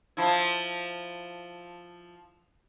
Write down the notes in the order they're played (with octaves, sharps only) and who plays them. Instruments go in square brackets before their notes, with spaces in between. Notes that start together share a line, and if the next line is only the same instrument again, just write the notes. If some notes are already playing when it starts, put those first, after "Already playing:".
[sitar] F3 E4